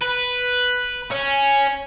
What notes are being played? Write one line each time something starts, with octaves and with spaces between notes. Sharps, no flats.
B4
C#4